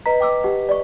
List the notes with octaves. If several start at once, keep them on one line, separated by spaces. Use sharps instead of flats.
B4 D#5 A#5 B6
G5 D6 E6
D#4 G4 F#5
D5 C#6